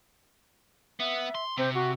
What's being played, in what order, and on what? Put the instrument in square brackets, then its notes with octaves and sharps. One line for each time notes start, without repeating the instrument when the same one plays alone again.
[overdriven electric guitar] B3 [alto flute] E5
[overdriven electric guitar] C6
[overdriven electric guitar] C3 [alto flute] C4
[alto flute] F#4